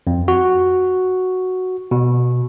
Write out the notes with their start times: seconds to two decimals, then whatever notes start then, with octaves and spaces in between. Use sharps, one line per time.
0.07 F2
0.28 F#4
1.91 B2